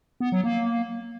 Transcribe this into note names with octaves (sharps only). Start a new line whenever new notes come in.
B3
F#3
A#3